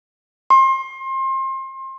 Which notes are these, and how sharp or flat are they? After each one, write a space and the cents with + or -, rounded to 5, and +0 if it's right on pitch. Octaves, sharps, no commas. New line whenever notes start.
C6 +30